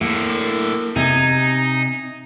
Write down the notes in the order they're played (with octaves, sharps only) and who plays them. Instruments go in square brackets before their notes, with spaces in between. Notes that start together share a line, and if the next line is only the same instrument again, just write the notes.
[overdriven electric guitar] A2 D3 [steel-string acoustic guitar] A#3
[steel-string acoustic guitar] C3 G#5 [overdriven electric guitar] D#4